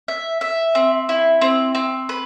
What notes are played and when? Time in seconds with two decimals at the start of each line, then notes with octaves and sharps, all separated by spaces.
0.08 E5
0.41 E5
0.75 C4
1.09 E4
1.42 C4
1.75 C4
2.09 B4